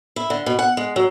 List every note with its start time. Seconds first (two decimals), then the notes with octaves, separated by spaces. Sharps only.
0.16 E4
0.30 D3
0.46 B2
0.59 F#5
0.77 G#3
0.96 F#3